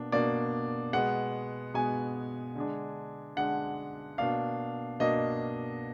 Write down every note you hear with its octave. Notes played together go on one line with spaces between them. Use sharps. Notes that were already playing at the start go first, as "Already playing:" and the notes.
Already playing: B2 A#3 D4
B2 A#3 D4 D5
B2 G#3 B3 F#5
B2 G#3 B3 G#5
D3 G#3 D4
D3 G#3 D4 F#5
B2 A#3 D4 F5
B2 A#3 D4 D#5